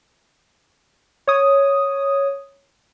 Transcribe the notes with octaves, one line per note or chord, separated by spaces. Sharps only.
C#5 D#6